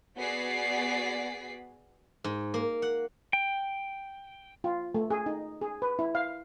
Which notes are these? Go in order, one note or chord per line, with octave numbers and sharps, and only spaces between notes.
B3 F#4 G#4 D5 B6 C7
G#2
A#3
F#5
G5
F4
A3
G#4
D#4
G#4
B4
E4
F5